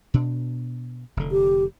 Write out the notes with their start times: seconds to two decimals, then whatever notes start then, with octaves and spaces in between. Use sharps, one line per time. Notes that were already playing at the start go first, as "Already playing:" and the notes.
0.14 B2 D4
1.17 F1 F2 D3
1.32 G4